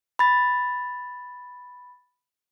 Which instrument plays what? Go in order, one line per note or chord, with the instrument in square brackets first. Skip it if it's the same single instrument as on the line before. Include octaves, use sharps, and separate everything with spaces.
[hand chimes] B5 A6